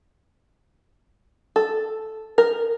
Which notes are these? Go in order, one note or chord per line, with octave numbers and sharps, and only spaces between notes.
A4
A#4